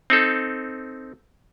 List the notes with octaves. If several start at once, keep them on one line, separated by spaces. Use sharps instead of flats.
C4 D#4 A4